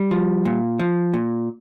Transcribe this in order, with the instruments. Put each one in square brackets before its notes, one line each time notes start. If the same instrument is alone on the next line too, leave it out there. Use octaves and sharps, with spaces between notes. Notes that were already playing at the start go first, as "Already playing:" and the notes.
Already playing: [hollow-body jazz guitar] G3
F3
A#2
F3
A#2